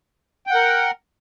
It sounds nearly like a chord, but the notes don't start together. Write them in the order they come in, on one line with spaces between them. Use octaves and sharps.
G5 F#5 A#4